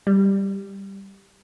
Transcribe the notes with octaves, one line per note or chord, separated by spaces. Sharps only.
G3